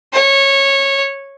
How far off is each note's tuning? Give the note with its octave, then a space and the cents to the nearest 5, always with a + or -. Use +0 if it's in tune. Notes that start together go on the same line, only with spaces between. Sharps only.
C#5 -15